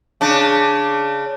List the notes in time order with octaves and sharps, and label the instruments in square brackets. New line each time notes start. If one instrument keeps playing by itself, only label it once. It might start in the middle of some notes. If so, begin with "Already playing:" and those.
[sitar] C#3 D4